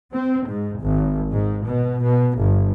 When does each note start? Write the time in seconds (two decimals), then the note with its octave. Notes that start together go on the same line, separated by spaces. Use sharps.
0.15 C4
0.48 G#2
0.81 G#1
1.29 G#2
1.64 B2
2.01 B2
2.37 G1